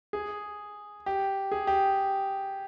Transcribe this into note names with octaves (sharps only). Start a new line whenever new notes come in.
G#4
G4
G#4
G4